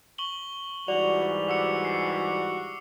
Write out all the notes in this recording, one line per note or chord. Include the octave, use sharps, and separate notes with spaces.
C#6 F#7 G7
G#2 E3 G3 F#4 D5 F7
F#4 D6 E6 C#7
C7